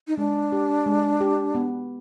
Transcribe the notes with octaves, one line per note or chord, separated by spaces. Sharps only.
D#4
G#3 D4
G4
G#3
G4
B3